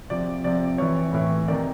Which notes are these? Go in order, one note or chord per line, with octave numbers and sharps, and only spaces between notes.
C3 F3 D5
C3 F3 D5
C3 E3 C#5
A2 E3
C3 D#3 D5